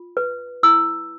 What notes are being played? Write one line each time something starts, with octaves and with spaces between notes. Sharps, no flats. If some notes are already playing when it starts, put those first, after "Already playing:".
Already playing: F4
B4
E4 E6